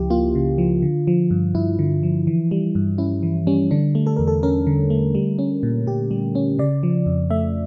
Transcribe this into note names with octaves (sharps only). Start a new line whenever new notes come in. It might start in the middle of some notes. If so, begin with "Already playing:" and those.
Already playing: C#2 C#3 F3 E4 G4
A#3 F4
C#3
F3
D3
F3
G2
G2 E4
D3
F3
E3
G3
G2
C#4 E4
E3
G3 C#4
D3 D4
A3
A4
E2 A#4
A4
C#4 A#4
D3
A3
G3
C#4
A#2
A#2 G4
G3
C#4
C#3 D5
F3
F2
A3 E5